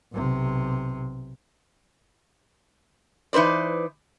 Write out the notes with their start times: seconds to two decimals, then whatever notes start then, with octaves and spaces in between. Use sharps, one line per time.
0.12 B1 C3
3.33 E3 D#4 B4 C5 D5